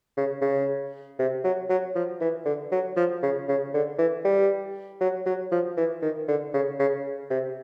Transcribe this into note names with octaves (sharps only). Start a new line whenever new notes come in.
C#3
C#3
C3
F#3
F#3
F3
E3
D3
F#3
F3
C#3
C#3
D3
E3
G3
F#3
F#3
F3
E3
D#3
D3
C#3
C#3
C3